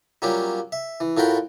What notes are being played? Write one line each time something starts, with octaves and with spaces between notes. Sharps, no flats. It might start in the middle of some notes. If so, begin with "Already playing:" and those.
F#3 G3 A#3 C#4 F4 G4
E5
E3
A2 F4 F#4 A#4 G5 B5